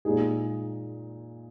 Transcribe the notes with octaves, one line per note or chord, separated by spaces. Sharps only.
A#2 G#3 D#4 G#4